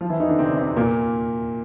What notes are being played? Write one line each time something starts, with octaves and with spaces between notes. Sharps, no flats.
F3 F4
E3 E4
D#3 D#4
D3 D4
C3 C4
C3 C4
A#2 A#3